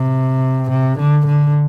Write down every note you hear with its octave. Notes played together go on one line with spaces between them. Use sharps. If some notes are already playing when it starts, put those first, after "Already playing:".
Already playing: C3
C3
D3
D3